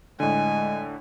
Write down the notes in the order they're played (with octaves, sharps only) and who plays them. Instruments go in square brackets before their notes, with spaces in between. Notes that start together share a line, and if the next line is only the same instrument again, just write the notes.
[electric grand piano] A2 D3 [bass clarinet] G#3 [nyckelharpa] G#5